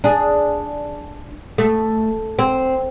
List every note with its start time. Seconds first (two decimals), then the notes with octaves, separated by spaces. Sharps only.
0.04 D4 G#4
1.58 A3
2.39 C4